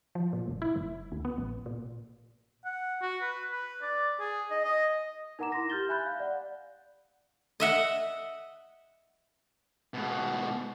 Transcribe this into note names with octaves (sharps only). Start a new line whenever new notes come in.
F3
A#2
F#1
E4
F#1
D2
B3
A1
A#2
F#5
F#4
B4
B4
D5
G#4
D#5
D#5
D#4 A#4 F#5 A#5 D6 E7
E4 C6 A#6
G4 F6 G6 A6 G7
E5 G#5 B5 F#6 G6
F5
D5 F#5
D#5 E5 F#5
G#2 B2